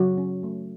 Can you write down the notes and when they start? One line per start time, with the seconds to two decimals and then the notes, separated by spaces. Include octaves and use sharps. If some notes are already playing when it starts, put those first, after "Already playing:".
Already playing: C#3 F#3 F#4
0.18 C#4
0.43 A3